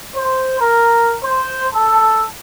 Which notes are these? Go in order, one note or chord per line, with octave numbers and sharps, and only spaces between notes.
C5
A#4
C5
A4